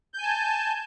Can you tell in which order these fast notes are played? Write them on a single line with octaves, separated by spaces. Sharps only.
G6 G#5 A5